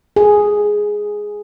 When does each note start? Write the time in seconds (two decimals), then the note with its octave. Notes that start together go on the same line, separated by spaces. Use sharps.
0.16 G#4